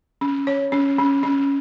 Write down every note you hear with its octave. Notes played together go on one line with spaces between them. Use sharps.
C#4
C#5
C#4
C#4
C#4